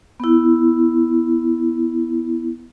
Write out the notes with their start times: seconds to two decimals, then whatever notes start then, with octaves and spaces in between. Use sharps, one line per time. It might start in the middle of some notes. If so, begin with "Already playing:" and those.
0.20 B3 E4